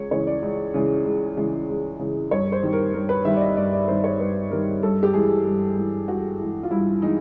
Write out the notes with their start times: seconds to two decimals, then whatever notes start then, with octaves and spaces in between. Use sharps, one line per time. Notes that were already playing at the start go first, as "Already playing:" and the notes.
Already playing: C#2 C#5
0.11 C#3 E3 G#3 C#5
0.27 D5
0.42 C#2
0.74 C#3 E3 G#3
1.05 C#2
1.37 C#3 E3 G#3
1.68 C#2
1.99 C#3 E3 G#3
2.31 G2 C#5
2.52 C5
2.63 D#3 G3
2.73 A#4
2.94 G2 A#4
3.09 B4
3.25 D#3 G3 E5
3.36 D5
3.41 D#5
3.57 G2 D5
3.73 D5
3.88 D#3 G3 C5
4.04 C#5
4.19 G2 B4
4.51 D#3 G3 A#4
4.83 G2 A4
5.03 G4
5.13 E3 G#3 G#4
5.45 G2
5.77 E3 G#3
6.08 G2 F#4
6.39 E3 G#3
6.63 F4
6.71 G2 E4
7.02 E3 G#3 D#4